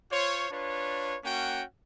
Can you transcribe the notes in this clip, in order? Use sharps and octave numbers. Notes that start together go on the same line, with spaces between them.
F4 C5 C#5
D4 F4 B4 C#5
A#3 C#4 F#4 F#5 G5